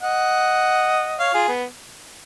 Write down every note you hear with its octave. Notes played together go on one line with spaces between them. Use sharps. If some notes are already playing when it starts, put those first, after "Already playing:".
D#5 F#5
C#5 F5
F4 G#4
B3